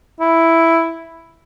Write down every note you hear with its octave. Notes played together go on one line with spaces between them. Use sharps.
E4